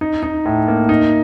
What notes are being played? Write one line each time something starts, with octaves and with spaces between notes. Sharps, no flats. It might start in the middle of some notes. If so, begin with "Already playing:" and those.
D#4
D#4
A2
A#3
D#4